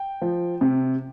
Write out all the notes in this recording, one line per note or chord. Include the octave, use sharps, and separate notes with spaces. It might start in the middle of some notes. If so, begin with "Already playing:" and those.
Already playing: G5
F3
C3